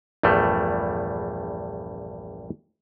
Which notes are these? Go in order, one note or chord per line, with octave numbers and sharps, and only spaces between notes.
A#1 E2 G2 G3 A3